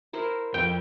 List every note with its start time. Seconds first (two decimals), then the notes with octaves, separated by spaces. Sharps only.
0.13 E4 A#4 C5
0.54 F2 G5